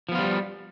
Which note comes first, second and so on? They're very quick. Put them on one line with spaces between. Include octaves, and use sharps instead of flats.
F3 B3 F4 G3